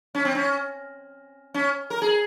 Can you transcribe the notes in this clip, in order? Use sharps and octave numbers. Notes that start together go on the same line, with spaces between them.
C#4
C4
C#4
C#4
A#4
G#4